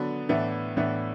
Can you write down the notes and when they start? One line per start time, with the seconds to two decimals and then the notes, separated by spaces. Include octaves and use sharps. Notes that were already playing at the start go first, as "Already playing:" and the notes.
Already playing: D3 F#3 B3 D4
0.29 A2 E3 B3 D4
0.77 A2 E3 B3 D4